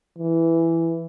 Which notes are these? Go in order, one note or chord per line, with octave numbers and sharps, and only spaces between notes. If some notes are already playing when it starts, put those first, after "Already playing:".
E3